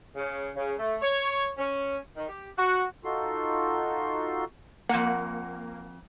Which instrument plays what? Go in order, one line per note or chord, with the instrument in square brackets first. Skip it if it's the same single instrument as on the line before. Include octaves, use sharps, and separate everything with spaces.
[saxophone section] C#3
C#3
A3
C#5
C#4
D#3
G4
F#4
[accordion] D#4 F4 F#4 A4 C6
[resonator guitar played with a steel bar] F2 F#5 [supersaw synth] A#3